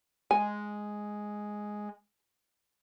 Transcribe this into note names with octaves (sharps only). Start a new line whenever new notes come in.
G#3 G#5